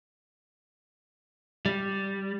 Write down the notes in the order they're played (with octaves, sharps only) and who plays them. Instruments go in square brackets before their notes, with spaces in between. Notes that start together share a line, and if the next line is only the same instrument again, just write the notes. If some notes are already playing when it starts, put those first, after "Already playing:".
[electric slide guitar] G3